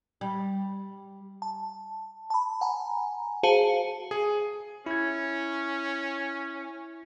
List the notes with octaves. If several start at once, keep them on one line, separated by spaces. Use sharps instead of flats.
G3
A5
A5 B5
F#5 G#5 A#5
F#4 G#4 C5 F5 A5 C#7
G#4
C#4 E4 G#6